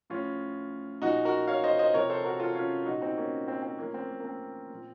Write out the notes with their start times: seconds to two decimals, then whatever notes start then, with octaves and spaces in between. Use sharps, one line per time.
0.10 A2 F3 C#4 F4
1.02 A#2 F3 D#4 F#4
1.25 F#4 A#4
1.48 C#5 F5
1.64 C5 D#5
1.79 C5 D#5
1.94 C3 F3 A#4 C#5
2.10 A4 C5
2.25 F#4 A#4
2.40 F4 A4
2.55 C#4 F4
2.86 A#2 F3 D#4 F#4
3.01 C4 D#4
3.17 A#3 C#4
3.48 C4
3.63 C4
3.78 A2 F3 A#3 C#4
3.94 C4
4.09 A#3
4.20 A#3
4.25 C4
4.70 A#2 F3